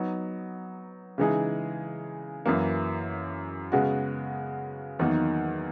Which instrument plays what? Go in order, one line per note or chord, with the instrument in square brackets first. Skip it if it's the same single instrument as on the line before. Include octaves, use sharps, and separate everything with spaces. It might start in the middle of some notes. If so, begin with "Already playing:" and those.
Already playing: [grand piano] F#3 B3 D#4
C#3 E3 G#3 D#4 G#4
F#2 E3 A#3
C#3 G#3 B3 F#4
E2 D#3 F#3 A#3 D#4